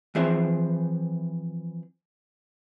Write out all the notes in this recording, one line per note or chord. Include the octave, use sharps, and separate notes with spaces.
E3 F3 C4 G#4 C5 E5